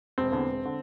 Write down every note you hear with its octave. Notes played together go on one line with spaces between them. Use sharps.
E1 C4
E2 D3
E1
D3